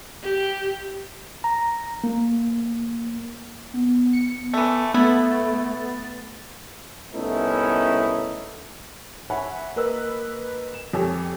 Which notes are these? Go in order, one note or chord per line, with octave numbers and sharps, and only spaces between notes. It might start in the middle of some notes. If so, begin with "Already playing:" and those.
G4
A#5
A#3
B3
C#7
E3 A3
A3 B3 E4 A6
C2 A3 B3 C#4 D#4 E4
C#5 E5 F#5 G#5 B5
A#3 A#4 B4 D#5 E6
E7
F2 G4 A4 C#5 G#5